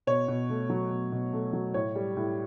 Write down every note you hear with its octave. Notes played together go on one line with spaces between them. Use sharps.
B2 C#5
B2
A3
F#3
B2
B2
A3
F#3
A2 C#5
G3
A2